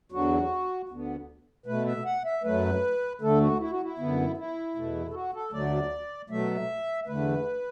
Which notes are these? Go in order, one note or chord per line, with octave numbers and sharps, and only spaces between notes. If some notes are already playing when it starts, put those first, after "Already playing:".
E2 D3 F#3 F#4
D2 D3 B3
B2 A3 B4
E5
F#5
E5
F#2 F#3 A3 B4
D2 D3 A3 A4
F#4
E4
F#4
E4
F#2 D3 B3
E4
E2 B2 A3
A4
F#4
A4
D2 D3 F#3 A3 D5
B2 F#3 A3 E5
E2 D3 A3 B4